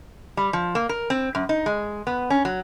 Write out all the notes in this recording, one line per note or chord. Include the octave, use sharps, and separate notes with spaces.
G3
F3
A#3
A#4
C4
F#2
D#4
G#3
B3
C#4
F#3